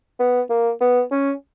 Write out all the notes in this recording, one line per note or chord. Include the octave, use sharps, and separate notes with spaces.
B3
A#3
B3
C#4